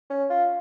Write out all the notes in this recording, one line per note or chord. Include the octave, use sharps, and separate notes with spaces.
C#4
F4